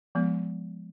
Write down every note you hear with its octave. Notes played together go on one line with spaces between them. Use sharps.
F3 G#3 B3